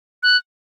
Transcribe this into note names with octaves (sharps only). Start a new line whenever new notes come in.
F#6